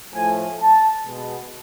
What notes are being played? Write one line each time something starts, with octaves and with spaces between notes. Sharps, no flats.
A2 F3 A3 G#5
A5
B2 G#3 B3